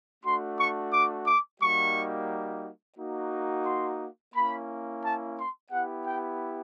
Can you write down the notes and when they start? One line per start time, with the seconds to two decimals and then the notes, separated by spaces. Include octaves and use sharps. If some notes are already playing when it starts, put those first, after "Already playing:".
0.24 A3 D4 F#4 C6
0.58 C#6
0.92 D6
1.26 D6
1.61 G3 A#3 D#4 F#4 C#6
2.97 A#3 D#4 F#4
3.66 C6
4.34 A#3 C#4 E4 B5
5.03 A5
5.37 C6
5.71 B3 E4 G4 F#5
6.06 G5